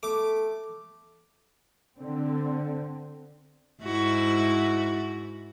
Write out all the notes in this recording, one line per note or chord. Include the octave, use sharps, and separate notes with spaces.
A3 D6
D3 C4
G#2 E4 F#4